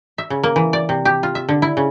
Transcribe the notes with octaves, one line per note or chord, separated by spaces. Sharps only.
E5
C#3
A#3
E3
D5
C3
G4
F4
E5
D3
E4
C#3